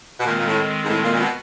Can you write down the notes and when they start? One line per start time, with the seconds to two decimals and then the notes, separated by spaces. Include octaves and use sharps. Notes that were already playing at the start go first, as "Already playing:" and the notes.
0.20 B2
0.25 A#2 D#3 G#3 C4
0.38 A#2
0.46 A2
0.84 G#2
0.87 A2
1.03 A#2
1.13 A#2
1.19 B2